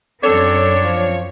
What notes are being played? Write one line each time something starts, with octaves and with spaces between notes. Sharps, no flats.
F#2 C4 D4 A4 C#5
F3